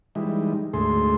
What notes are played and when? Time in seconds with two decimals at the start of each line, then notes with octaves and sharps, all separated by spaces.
0.15 E3 G3 G#3 D#4
0.74 D2 G#2 A3 G#4 A4 C6